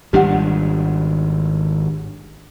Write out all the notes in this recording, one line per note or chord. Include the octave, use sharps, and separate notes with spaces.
G#1 G3 D4 G4 F#5